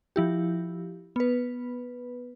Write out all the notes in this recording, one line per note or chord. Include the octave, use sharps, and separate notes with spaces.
F3 E4 G4
B3 B4